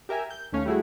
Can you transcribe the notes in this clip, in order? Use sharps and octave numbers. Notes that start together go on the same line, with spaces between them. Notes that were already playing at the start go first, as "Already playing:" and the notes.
G4 A#4 E5 G#5
G6
D#2 A3 C#4 C#5 F5
G3 A3 E4 F#4 G#4